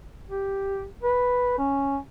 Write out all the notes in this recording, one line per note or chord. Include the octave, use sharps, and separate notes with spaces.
G4
B4
C#4